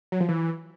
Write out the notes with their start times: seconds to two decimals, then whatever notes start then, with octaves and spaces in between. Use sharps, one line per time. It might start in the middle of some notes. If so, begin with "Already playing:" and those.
0.12 F#3
0.20 F3
0.29 E3